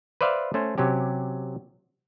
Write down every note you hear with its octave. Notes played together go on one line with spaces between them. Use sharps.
B4 C5 D5 E5 F5
A3 C#4 C5
C3 F#3 C#4 G4